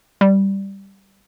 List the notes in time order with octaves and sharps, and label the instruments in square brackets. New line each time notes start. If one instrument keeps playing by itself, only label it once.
[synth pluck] G3